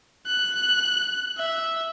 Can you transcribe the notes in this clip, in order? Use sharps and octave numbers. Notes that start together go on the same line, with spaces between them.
F#6
E5